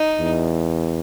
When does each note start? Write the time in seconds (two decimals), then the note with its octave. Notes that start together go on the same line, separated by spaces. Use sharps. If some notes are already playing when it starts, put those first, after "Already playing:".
Already playing: D#4
0.20 E2